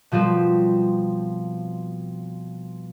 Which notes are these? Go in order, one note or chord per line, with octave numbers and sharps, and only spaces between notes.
B2 F3 G3 C4